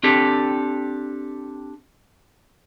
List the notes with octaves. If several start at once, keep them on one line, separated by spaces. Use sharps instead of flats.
C4 D4 G4 A4